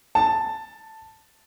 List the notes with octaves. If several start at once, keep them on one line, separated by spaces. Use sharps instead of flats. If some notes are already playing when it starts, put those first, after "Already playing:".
A5